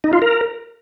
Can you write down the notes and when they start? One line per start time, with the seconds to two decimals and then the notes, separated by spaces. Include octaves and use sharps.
0.04 D#4
0.13 F4
0.22 A#4